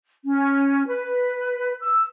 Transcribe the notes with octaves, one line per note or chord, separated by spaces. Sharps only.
C#4
B4
E6